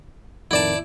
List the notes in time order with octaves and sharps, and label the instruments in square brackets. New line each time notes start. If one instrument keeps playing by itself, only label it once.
[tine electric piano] F2 A2 D#3 [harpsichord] E4 D5 A5